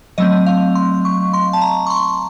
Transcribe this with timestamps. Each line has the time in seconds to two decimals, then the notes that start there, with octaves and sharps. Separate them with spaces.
0.18 F#3 A3 C4 D#5
0.46 F5
0.75 C6
1.05 C#6
1.33 C6
1.53 A5
1.61 A#5
1.87 C#6
1.90 C6